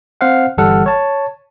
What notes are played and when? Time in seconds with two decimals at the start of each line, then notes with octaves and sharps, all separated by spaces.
0.21 C4 C5 F5 F#5
0.58 G1 E3 G3 A4 F#5 F6
0.86 C#5 A5